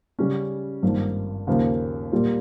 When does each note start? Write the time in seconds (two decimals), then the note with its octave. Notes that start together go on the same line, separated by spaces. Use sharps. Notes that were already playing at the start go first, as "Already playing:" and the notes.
0.19 C#3 G3 C#4
0.83 G#1 G2 F3 A#3
1.47 D#2 C#3 F3 A#3
2.12 A#2 G3 A#3 F4